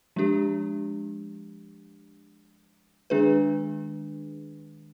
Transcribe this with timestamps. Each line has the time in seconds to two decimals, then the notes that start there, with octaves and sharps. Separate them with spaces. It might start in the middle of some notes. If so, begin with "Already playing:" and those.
0.16 F3 G#3 D4 G4
3.10 D#3 G#3 D4 G#4 B4